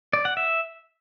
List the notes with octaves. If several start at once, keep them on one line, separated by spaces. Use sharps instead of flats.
D5
F#5
E5